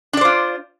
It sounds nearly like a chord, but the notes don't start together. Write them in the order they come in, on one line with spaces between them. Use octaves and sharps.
D4 D5 C5 F4